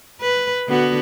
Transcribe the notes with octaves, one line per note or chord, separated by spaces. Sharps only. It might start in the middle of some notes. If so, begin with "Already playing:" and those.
B4
D3 B3 F#4